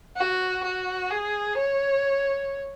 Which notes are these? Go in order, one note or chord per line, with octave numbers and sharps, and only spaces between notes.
F#4
F#4
G#4
C#5